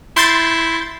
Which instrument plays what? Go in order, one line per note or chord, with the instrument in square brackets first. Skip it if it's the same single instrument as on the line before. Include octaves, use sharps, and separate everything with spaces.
[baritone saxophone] E4 [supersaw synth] C6 G6 A6